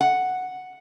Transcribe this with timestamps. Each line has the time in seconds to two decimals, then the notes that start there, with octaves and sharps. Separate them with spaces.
0.01 F#5